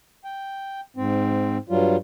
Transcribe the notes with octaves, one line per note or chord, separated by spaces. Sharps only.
G5
G#2 C4
G2 F#3 G3 F4